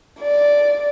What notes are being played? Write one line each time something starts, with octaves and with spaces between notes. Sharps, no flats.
D5